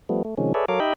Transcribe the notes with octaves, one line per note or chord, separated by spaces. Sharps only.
F3 G3 A3 B3
A3
C3 D#3 F3 G#3 C#4
G#4 A4 B4 C#5 D5 E5
F#3 A4 A#4 C#5 F5 D6
D#4 G4 D#5 E5 G5 B5